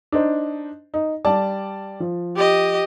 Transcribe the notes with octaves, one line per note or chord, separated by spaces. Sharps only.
D4 D#4 C5
D#4
G3 D5 A5
F3
G4 D#5